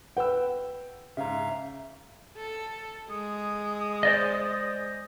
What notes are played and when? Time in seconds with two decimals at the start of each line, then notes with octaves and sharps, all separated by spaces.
0.17 B4 F#5 G5 E6
1.17 G#2 C#3 E5 F5 A#5
2.36 A4
3.10 G#3 D#6
4.03 C5 D5 D#5